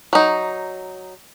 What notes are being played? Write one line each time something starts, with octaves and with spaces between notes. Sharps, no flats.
F#3 D#4